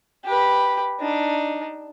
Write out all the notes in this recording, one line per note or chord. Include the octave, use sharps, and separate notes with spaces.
G4 B4
D4 D#4